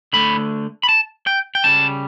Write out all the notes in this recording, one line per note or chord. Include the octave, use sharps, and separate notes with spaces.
D3 A3 B5
B5
A5
G5
G5
C#3 G3 A5